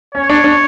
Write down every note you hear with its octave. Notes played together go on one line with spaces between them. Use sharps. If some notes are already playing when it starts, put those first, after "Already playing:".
C#4 C#5
D4
D4